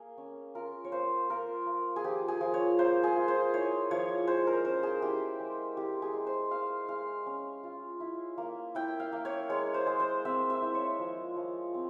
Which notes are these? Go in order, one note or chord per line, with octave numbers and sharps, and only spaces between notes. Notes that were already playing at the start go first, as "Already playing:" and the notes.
Already playing: A#3 G#4
C#4
F4 A#4
C#5
A#3 C5
F4 A#4
A#3
G#4
F3 G4
G#4
F3
C#5
A#3 C5
G#4
F4
C5
E4 C#5
F3 C#5
G#3 C5
A#4
C#4 C5
G#4
E4 G4
G#3
E4 G4
G#4
G#3
C5
G#3 F5
G#3 F5
C#4
F4
E4
A#3
E4 G5
F5
A#3
C#5
G#3 C#5
C5
G#3
C5
C4 E5
E5
E4
C#5
F3
F3
C4